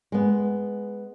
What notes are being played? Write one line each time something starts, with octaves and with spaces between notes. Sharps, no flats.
G#3 B3